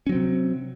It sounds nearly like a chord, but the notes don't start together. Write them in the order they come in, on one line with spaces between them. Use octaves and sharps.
C#4 F#3 C4 C3